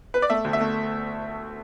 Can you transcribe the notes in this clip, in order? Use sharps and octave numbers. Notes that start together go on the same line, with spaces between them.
B4
D5
A3 E5
D2
E5
A3